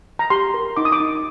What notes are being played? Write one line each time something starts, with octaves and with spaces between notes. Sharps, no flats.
A#5
G4 C6
A#4
D#4 D6
D#6
D6
D#4